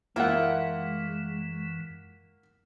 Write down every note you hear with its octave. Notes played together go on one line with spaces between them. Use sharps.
F#2 E3 G#3 A#3 E4 F4 F#5 G5